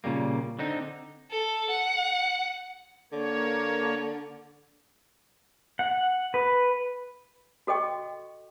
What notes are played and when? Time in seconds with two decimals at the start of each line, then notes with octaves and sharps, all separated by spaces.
0.04 A#2 C#3 G3 A#3
0.59 D3 C4 D#4
1.31 A4
1.69 F#5
3.12 D3 A#3 C#5
5.79 F#5
6.34 B4
7.67 F#4 A4 D#5 G5 C#6